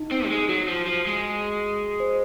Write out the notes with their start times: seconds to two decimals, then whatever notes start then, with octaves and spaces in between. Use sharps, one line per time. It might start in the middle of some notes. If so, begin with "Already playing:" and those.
Already playing: D#4
0.11 C4
0.26 F#3
0.30 G#3
0.49 F#3 F#4
0.68 F3
0.87 F3
1.07 G#3
2.00 C5